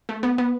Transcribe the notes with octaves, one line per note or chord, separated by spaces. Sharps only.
A3
B3
B3